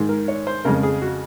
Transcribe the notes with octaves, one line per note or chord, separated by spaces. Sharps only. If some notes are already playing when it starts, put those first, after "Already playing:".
Already playing: G#2 D#3 G#3
A#4
C#5
C5
F2 C#3 G#3 A#4
G#4
F#4